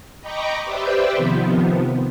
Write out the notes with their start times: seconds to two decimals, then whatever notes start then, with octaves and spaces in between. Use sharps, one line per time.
0.21 D#5 G5 A#5 B5 C#6 D6
0.65 G4 B4 C5 D5 E5 G5
1.16 C3 D#3 F3 B3